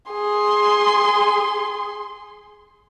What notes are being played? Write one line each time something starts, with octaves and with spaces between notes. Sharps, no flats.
G#4 C6